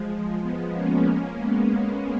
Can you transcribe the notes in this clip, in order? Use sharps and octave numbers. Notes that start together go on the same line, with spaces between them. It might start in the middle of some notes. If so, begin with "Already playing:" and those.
Already playing: F3 G#3
G#3 B3
A#3 C#4
A#3 C#4
G#3 B3
A#3 C#4